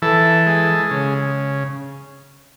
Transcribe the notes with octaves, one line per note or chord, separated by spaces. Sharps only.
E3 A4
G#3
C#3